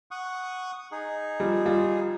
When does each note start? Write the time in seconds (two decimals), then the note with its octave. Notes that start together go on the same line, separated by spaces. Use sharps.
0.11 F#5 C#6 D#6
0.91 D#4 G#4
1.40 F3 G3
1.66 G3 F4